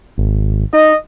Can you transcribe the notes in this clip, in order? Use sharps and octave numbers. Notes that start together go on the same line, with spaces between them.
G#1
D#4 D#5